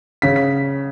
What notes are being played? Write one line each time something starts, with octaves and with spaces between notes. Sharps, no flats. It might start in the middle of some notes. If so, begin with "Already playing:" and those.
C#3 B6
B6